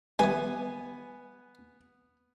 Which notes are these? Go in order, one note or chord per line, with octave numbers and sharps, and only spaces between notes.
E3 G3 B3 G#5